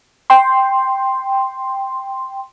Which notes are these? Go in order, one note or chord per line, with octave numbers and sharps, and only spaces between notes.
G5 C6